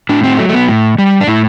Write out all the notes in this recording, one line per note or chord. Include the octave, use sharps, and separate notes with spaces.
A2 D4
C4
F#3 A3
A3
B3
A2
G3
D4
A2 E4